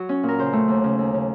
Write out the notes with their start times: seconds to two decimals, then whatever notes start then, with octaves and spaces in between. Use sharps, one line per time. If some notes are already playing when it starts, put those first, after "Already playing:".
Already playing: F#3 F#4
0.09 C#4
0.23 A#2
0.28 A#4
0.39 C#3 C5
0.53 A3
0.68 D#2
0.84 C#3
0.99 D#2
1.14 C#3